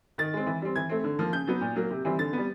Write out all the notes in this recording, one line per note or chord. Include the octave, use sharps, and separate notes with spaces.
D#3 A6
G#3 C4
E3
G3 C4
E3 G#6
A3 C4
D3
F3 A#3
C#3 G6
F#3 B3
A#2
F#3 A#3
C3
E3 G3 C4
D3 A6
G3 B3